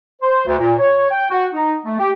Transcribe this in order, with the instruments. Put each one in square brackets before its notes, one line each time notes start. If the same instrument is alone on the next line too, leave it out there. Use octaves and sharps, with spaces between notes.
[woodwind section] C5
D2
A#2
C#5
G5
F#4
D#4
A3
G4